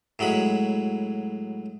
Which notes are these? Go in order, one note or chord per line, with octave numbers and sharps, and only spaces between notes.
A2 F#3 G#3 B5